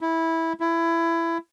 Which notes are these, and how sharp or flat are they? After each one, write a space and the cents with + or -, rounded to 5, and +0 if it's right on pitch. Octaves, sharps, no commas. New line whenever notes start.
E4 -10
E4 +20